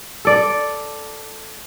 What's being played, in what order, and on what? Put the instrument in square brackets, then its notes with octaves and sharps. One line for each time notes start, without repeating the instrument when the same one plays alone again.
[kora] A4 D5